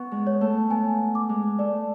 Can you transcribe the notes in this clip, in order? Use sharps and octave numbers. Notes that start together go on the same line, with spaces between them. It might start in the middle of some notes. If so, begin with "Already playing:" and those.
Already playing: B3 C#6
G#3
C#5
A3
B3 G#5
D6
G#3
A3 D5